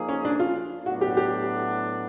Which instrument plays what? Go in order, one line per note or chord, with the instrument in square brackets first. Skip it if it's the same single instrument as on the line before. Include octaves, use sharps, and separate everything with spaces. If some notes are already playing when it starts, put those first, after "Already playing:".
Already playing: [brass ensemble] F3 A#3 D#4 G#4
[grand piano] C#4
D4
F4
[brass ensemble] A2 F#3 B3 D4 [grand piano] F#4
[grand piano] G4
G4